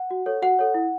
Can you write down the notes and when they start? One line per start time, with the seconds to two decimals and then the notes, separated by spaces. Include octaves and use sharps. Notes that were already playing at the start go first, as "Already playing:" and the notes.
Already playing: F#5
0.11 F#4
0.26 A4 C#5
0.42 F#4 F#5
0.59 A4 C#5
0.74 E4